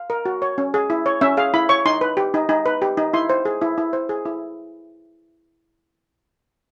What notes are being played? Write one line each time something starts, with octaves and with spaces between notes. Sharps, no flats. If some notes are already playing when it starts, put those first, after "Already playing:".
Already playing: F5
A#4
F#4
C#5
C#4
G#4
E4
C#5
C#4 E5
G#4 F5
E4 B5
C#5 C#6
D#4 C6
B4
G4
D#4
D#4
B4
G4
D#4
E4 C6
C5
G#4
E4
E4
C5
G#4
E4